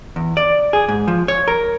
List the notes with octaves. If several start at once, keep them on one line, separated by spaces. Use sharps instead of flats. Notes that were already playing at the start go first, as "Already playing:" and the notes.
E2
D5
G#4
G#2
F3
C#5
A#4